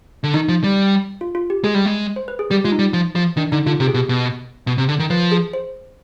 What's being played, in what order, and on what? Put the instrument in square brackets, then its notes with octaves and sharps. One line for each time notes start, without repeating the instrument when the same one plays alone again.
[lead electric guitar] D3
[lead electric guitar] D#3 [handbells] D#4
[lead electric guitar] F3
G3
[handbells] F4
F4
G4
[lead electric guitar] G#3 [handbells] G#4
[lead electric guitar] G3
G#3
[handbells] C5
B4
G#4
[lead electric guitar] G3 [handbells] G4
[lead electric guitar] G#3 [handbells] F4
[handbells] D#4
[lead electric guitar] G3
F3
F3
[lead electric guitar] D#3 [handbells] D4
[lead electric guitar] D3 [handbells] D#4
[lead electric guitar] D3 [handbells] F4
[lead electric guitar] C3 [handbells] G4
[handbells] G#4
[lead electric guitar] B2 [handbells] G4
[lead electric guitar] B2
B2
C3
D3
D#3
[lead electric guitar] F3 [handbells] B4
[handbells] G#4
C5